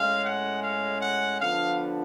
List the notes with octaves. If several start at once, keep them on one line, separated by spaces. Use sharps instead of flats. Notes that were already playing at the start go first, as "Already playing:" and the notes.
Already playing: A2 G#3 C#4 F5
F#5
F5
F#5
D3 F3 B3 D4 F5